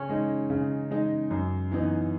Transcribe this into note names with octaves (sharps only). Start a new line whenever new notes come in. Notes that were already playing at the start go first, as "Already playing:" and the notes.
Already playing: C#3 C#4
G#3 D#4
C#3
G#3 D#4
F#2
E3 B3 D#4